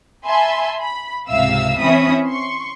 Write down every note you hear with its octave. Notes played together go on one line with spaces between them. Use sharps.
E5 G#5 A5 B5 C6
B5
C#2 G#2 C3 E5 F5 E6
E3 C4 C#4 E5 B5 D#6
C6 C#6